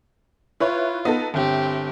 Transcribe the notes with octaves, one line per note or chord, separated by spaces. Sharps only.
E4 F4 B4 C#5
B3 D#4 A4
G1 C4 G4 E5